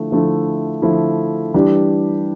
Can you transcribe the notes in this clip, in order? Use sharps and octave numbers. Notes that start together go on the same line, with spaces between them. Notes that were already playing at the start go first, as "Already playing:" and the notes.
Already playing: D3 F3 A3 E4
D3 F3 A3 E4
D3 F3 A3 E4
E3 G3 D4 G4 D5